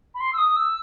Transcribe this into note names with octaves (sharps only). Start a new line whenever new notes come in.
B5
C6
E6
D#6
E6